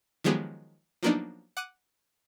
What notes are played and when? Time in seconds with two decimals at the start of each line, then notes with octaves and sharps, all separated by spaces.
0.24 D#3 F3 F#3 G#3 B3 G4
1.03 F3 F#3 A#3 B3 D4 D#4
1.57 F#5 D6 F#6 D#7